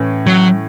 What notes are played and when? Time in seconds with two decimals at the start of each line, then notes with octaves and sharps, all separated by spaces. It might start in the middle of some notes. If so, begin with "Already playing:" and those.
Already playing: A2 E3 C#4
0.27 F#3